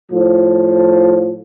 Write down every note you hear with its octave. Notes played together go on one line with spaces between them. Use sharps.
A2 F3